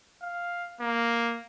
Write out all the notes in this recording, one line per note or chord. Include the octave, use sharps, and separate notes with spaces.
F5
A#3